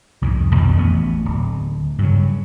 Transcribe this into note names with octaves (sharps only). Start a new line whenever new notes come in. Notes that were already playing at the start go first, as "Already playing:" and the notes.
C2 F2 G#2
F2 B2 D#3 F3
A1 B3
D1
G2 C#3 F#3